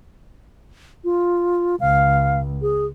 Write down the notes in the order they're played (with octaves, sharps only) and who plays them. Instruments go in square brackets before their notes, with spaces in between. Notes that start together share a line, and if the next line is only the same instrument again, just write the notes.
[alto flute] F4
[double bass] C#2 [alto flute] F5
[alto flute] G#4